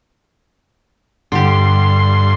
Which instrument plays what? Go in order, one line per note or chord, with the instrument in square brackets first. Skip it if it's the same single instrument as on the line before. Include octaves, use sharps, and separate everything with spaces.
[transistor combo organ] G2 C6 [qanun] D3 G4